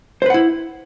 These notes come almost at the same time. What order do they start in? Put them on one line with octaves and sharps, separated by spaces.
C5 B4 F#5 E4